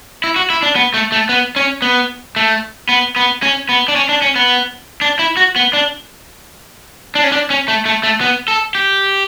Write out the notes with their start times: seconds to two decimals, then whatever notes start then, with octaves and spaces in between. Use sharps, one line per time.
0.24 E4
0.36 F#4
0.50 E4
0.63 D4
0.76 B3
0.94 A3
1.12 A3
1.29 B3
1.56 C#4
1.82 B3
2.36 A3
2.89 B3
3.16 B3
3.43 C#4
3.69 B3
3.88 D4
3.96 C#4
4.09 D4
4.22 C#4
4.36 B3
5.01 D4
5.19 E4
5.37 F#4
5.56 B3
5.73 D4
7.15 D4
7.24 C#4
7.32 D4
7.50 C#4
7.68 A3
7.86 A3
8.03 A3
8.21 B3
8.48 A4
8.75 G4